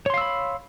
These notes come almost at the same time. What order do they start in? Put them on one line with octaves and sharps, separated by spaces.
C#5 C6 F5 E6 B5